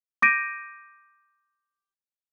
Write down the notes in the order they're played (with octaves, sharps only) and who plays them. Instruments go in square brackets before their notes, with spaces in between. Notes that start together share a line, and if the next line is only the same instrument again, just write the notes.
[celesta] D6 G6 A#6 D7 D#7